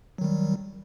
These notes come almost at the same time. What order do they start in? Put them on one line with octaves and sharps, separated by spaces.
F#3 D#3 G3